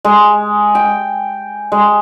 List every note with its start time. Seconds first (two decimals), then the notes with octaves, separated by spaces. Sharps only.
0.05 G#3
0.75 G5
1.72 G#3